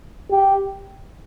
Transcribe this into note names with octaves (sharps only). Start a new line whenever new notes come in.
G4